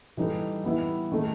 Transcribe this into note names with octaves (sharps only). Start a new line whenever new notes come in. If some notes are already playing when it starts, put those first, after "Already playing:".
E3 G3 D#4 A4
E3 G3 B3 E4
D#3 A3